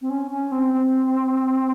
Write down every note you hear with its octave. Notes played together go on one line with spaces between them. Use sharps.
C4
C#4
C#4
C4
C4